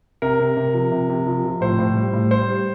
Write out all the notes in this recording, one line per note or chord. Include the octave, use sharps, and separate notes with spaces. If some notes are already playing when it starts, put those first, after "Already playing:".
C3 A#4
C3
C3
F3
C3
C3
F3
F3
A2 C5
A2
G3
A2
G3 C5
G3